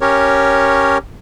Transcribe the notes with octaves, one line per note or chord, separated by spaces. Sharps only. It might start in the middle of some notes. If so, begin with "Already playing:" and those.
C#4 G4 A#4 C#5